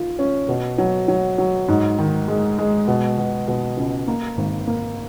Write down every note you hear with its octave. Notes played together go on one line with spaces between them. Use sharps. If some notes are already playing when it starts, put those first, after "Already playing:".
Already playing: D#3 F4
C#4
B2
F#3
F#3
F#3
G#2
D#3
G#3
G#3
B2
B2
B2
C#2
A#3
G#1
A#3